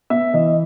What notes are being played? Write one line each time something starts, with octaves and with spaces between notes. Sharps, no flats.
B3 E5
E3 D#5